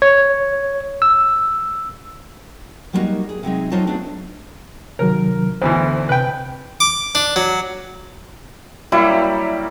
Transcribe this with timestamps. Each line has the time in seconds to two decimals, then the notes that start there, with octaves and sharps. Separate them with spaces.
0.02 C#5
1.02 E6
2.93 F#3 G3 A#3 B3 D#4 F#4
3.29 G#4
3.43 C3 F#3 G#3 D#4
3.72 F#3 D#4 F4 C5 C#5 A5
3.87 A3 B3 D4 G#4
4.99 C3 D#3 F#3 A#4
5.62 D2 B2 E3 C5
6.09 C3 B4 G5
6.80 D6
7.15 D4
7.36 F#3
8.92 F#3 G3 A#3 E4